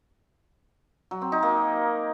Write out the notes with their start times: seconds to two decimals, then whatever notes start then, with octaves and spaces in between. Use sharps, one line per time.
1.11 F#3
1.22 C4
1.32 D#4
1.43 A#3